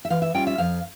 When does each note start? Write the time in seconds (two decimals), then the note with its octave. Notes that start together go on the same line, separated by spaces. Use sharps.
0.05 E5
0.10 E3 F5
0.22 E5
0.34 G3 C#4 F4 G5
0.47 E5
0.58 F2 F5